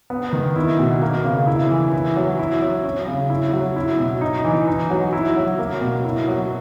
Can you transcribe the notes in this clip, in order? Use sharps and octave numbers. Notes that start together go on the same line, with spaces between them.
B3
D#3
E4
B2
A#3
C#3
E4
E3
E4
F#3
E4
F#3
C#4
C#3
E4
F#3
E4
B2
D#4
E3
D#4
F#3
E4
F#3
A#3
B2
E4
F#3